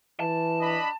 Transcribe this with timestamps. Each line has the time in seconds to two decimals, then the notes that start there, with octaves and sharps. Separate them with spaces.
0.20 E3 A5
0.61 D4 D#5 B5